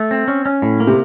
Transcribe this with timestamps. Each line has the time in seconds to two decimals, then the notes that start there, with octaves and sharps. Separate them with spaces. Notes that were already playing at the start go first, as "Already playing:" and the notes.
Already playing: A3
0.11 C4
0.28 C#4
0.46 C#4
0.62 A2
0.80 A#3
0.87 C3